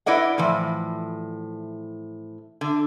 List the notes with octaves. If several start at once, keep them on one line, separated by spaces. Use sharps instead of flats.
E4 B4 D5 D#5 F#5
A2 E3 F3
D3